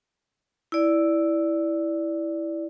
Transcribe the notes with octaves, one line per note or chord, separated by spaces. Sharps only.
E4 D5